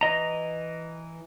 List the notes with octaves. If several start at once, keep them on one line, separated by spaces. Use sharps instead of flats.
E3 D#5 A#5